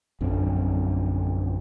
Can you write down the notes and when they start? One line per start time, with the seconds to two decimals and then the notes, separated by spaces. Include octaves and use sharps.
0.21 A#1 F#2 D3 C4